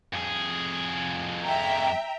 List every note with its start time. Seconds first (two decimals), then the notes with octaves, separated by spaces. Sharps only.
0.13 F2 G#4
1.44 E5 G5 A#5